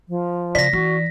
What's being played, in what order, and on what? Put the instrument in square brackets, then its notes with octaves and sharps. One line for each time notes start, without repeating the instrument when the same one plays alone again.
[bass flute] F3
[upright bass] C#3 [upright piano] D5 [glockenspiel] A#6 B6
[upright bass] E3 [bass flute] F#4